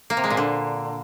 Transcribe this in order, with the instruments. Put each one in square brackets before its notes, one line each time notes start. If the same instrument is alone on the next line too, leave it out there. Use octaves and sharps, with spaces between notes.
[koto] A#3
C3
G#3
A#2
D3